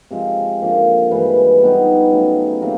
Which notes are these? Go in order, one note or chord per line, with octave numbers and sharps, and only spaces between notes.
C3 F3 G#3
D3 F3 A#3
G2 E3 G#3
G3 B3 D#4
C#3 F#3 A3
C3 D#3 F#3 A#3